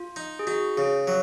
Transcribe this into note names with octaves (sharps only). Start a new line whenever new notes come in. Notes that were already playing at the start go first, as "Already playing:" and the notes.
Already playing: F4
D#4
G#4
D#4 F#4
C#3 G#4
F#3